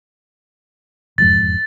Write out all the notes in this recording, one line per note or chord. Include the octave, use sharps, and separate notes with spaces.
E1 F2 G#2 A6